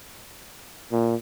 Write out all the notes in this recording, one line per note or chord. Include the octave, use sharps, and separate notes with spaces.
A#2